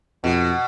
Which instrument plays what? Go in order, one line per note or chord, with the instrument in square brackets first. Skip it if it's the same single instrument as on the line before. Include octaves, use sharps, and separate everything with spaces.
[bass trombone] F2 [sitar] B2